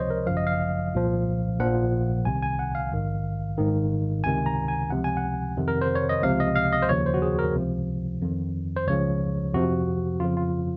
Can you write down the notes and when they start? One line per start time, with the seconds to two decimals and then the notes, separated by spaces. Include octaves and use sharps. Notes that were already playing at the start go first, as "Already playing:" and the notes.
Already playing: C#2 C3 F3 C5 C#5 D#5
0.10 A#4
0.27 G#1 F#2 C#3 F3 F5
0.37 D#5
0.47 F5
0.94 C2 A#2 F3
1.59 A#1 A#2 F3 F#5
2.25 C2 C3 D#3 G#5
2.42 G#5
2.59 F#5
2.75 F5
2.92 A#1 G#2 D#3
3.58 G#1 G#2 D#3
4.24 C#2 C3 D#3 G#5
4.46 A#5
4.68 G#5
4.90 C#2 C3 F3 F#5
5.04 G#5
5.17 F#5
5.57 F2 C3 D#3
5.68 A#4
5.81 C5
5.95 C#5
6.09 D#5
6.22 C#2 C3 F3 F5
6.40 D#5
6.55 F5
6.73 D#5
6.82 C5
6.89 D#2 C#3 F3 C#5
7.06 C5
7.14 F#4
7.22 G#4
7.39 A#4
7.56 C#2 C3 F3
8.22 F2 D#3
8.76 C5
8.87 C#2 C#3 F3 C#5
9.54 F2 C3 F3 F#4
10.20 F2 C#3 F3 F4
10.37 F4